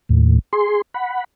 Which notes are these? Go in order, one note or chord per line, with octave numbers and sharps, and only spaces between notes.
D#2 A2
G#4 C6
F#5 B5